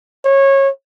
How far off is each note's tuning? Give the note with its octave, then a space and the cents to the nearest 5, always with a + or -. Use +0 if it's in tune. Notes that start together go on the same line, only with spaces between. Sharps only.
C#5 -20